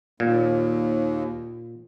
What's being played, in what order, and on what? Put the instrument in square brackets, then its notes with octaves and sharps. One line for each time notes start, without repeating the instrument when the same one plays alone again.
[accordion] D#2 [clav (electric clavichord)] A#2